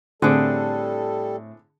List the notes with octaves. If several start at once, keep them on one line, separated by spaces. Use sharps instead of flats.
A2 D3 G3 C4 G#4 A4